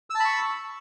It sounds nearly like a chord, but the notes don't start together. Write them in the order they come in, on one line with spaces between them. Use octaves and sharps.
E6 A5 B5 C#6